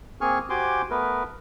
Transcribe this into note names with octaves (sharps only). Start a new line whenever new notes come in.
A#3 C4 G#4 G#5 C#6 F6
F#4 G4 C5 G#5 C6 D6
A3 B3 A#4 B4